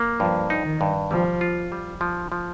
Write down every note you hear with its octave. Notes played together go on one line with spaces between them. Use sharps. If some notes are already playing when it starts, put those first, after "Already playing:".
Already playing: A#3
G2 F3
D#4
D#3
G2
F3 G3
F4
G3
F3
F3